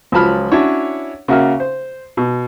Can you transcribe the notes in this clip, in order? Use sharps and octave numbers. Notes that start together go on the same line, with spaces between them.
C#2 F3 F#3 A5 B5 F6
C#4 D4 E4 F#4 C#5
C#3 A#3 F#4 E5 F#5 F6
C5
B2